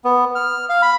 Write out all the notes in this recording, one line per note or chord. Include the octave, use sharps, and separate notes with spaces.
B3
F6
F5
B5